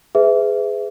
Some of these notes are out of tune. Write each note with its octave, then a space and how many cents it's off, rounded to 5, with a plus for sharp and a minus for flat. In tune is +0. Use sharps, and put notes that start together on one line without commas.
G#4 +0 B4 +35 E5 +0